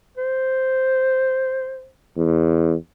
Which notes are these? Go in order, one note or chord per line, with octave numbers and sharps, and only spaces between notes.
C5
E2